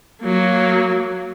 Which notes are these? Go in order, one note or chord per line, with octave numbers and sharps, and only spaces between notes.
F#3 A#3